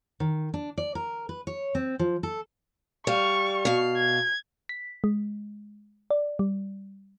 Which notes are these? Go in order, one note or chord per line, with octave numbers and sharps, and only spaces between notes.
D#3
D4
D5
A#4
B4
C#5
C4
F3
A4
G3 F5 C#6
B2 F5
G#6
B6
G#3
D5
G3